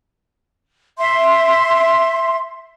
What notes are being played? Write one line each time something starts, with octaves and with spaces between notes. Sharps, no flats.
E5 C6